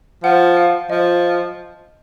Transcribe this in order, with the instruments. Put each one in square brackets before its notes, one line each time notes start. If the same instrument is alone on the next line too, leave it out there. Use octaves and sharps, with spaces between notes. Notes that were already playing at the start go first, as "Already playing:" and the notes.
[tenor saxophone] F3 [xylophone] F#5
[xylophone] F5
[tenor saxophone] F3 [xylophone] D#5